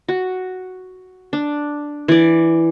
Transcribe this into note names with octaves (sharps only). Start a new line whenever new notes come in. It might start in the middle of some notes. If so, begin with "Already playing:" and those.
F#4
D4
E3 D5